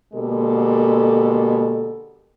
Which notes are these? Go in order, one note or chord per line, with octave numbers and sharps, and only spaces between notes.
B2 D3 G#3 A#3 G4 A4